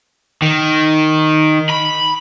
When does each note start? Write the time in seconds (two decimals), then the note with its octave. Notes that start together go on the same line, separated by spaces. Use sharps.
0.42 D#3
1.69 B5